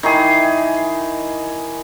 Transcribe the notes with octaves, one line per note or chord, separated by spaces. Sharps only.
D#3 E3 G#4